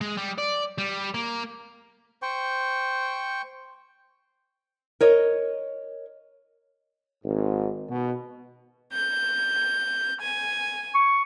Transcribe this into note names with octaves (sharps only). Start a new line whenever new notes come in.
G#3
G3
D5
G3
A#3
C5 G5 C#6
A#4 C#5 D#5
G#1 G#2
B2
G6
G#5
C#6